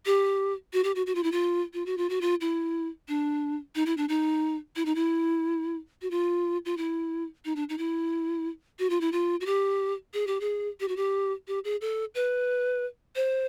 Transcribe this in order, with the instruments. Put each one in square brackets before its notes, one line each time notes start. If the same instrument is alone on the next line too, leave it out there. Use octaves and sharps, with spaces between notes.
[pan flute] G4
F#4
G4
F#4
F#4
F4
E4
F4
F4
F#4
F4
F#4
F4
E4
D4
D#4
E4
D4
D#4
E4
D#4
E4
F#4
F4
F4
E4
D#4
D4
D#4
E4
F#4
F4
E4
F4
F#4
G4
G#4
G4
G#4
G4
F#4
G4
G4
G#4
A4
B4
C5